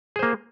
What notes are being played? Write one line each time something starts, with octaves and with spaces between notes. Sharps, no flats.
A#3 G#4 C5